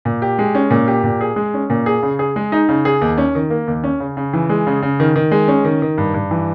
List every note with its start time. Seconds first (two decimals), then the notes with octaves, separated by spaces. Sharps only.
0.05 A#2
0.22 G4
0.39 G#3
0.55 C#4
0.70 A#2
0.88 G4
1.04 A#2
1.21 G#4
1.36 G#3
1.54 C#4
1.70 A#2
1.86 G#4
2.03 C#3
2.19 G#4
2.36 G#3
2.52 D#4
2.69 C#3
2.85 G#4
3.01 D#2
3.18 C#4
3.35 D#3
3.50 A#3
3.67 D#2
3.84 C#4
4.00 C#3
4.17 C#3
4.33 E3
4.49 G#3
4.67 C#3
4.82 C#3
5.00 D#3
5.16 D#3
5.31 G#3
5.48 C#4
5.64 D#3
5.82 D#3
5.98 G2
6.14 G2
6.31 E3